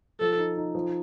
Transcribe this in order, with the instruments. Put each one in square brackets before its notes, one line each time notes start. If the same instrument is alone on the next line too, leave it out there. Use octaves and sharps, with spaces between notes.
[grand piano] F3 [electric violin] A4
[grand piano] D#4
D#4
F3